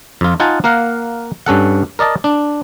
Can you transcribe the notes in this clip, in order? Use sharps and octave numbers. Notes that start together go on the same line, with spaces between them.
F2 F4
D#4 F4 F#5 G#5 A5
A#3 A#4 F5 F#5
G2 C#4 A4 F#5
A#4 D5 D#5 A5
D4